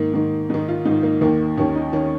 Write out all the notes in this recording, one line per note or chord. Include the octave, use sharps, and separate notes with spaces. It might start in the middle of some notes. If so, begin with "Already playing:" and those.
Already playing: G#2 D#3 A#3
G#2 D#3
G#2 D#3 D#4
F4
G#2 D#4
D#3
A#3
D#2 D#3 A#3
D#2 D#3 C#4
D#4
D#3 C#4